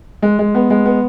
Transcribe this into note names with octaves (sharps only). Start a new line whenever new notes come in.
G#3
G#3
B3
G#3
B3